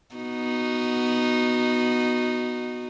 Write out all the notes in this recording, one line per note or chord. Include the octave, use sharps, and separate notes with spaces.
B3 D#4 F#4